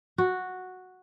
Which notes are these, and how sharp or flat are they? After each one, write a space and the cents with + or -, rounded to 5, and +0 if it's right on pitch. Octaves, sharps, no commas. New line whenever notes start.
F#4 -5